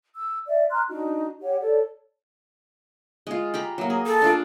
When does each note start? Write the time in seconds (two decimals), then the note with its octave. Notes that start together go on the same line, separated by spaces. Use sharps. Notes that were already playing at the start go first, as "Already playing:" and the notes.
0.15 E6
0.47 D5 E5
0.70 A#5 C6 F6 F#6
0.89 D4 D#4 F#4 D#5
1.42 G4 C#5 F#5
1.60 A4 C#5 D5
3.27 G#3 F4
3.54 G4 A#5 B5
3.78 F#3 A#3
3.90 G#4
4.06 A4
4.22 D4 F4 D5